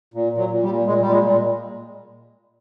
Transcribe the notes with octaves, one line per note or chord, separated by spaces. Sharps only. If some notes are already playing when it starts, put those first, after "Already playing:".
A#2
A#2
F#3
A#2
G3
A#2
A#2 G#3
A#2 G3
G#3
A#2